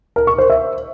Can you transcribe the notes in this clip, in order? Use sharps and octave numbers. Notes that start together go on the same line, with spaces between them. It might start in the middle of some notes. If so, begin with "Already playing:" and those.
A#4
C#6
C5
E5